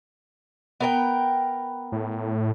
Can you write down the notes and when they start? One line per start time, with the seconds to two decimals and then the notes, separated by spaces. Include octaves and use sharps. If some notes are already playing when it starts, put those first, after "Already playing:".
0.80 B3 A#4 G5
1.92 A2